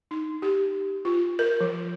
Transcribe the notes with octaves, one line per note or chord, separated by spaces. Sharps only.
D#4
G4
F4
A#4
F3